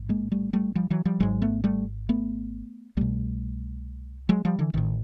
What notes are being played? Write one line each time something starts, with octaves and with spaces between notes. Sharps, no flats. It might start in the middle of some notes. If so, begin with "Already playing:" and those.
Already playing: A1 G#2
G#3 A#3
G3 A3
G3 A3
F3 G3
E3 F#3
F3 G3
G#1 G#2 F#3 G#3
A3 B3
G3 A3
A3 B3
C2 B2 G3 A3
F#3 G#3
F3 G3
D3 E3
A1 A2 D#3